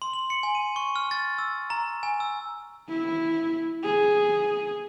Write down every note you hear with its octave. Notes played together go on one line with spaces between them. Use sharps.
C6
F#7
C#7
G#5
D#7
C#6
F6
A6
E6
A#5
G#5
E6
E4
G#4